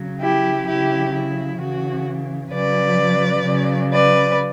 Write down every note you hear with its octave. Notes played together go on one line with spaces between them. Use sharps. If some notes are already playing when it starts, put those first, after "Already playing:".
Already playing: C#3 F#3
E4 G4
C#3 F#3 E4 G4
E4
C#3 E3 F#4
C#3 F#3 B4 D5
C#3 F#3
B4 D5